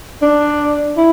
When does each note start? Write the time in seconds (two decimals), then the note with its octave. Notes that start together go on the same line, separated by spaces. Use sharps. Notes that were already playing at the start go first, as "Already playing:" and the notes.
0.22 D4
0.97 E4